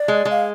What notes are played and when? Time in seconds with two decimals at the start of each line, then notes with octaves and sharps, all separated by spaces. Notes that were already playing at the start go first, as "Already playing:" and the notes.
Already playing: D5
0.08 G#3
0.25 G#3
0.31 F5